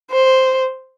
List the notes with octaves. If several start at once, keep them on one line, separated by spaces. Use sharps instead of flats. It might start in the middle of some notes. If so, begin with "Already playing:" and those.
C5